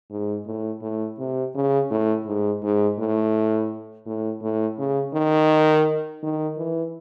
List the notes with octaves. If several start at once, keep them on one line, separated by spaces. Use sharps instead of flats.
G#2
A2
A2
C3
C#3
A2
G#2
G#2
A2
A2
A2
C#3
D#3
D#3
E3